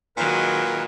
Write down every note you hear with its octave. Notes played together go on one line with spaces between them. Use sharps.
A#2 D#3 F#3 G#3 A#4 B4